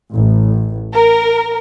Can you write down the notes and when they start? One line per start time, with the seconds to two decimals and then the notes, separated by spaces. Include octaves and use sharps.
0.14 A1
0.94 A#4